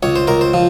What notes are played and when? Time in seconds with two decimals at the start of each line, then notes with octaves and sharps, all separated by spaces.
0.03 C#2 C#5
0.16 C5
0.27 C#2 A#4
0.41 C5
0.54 F3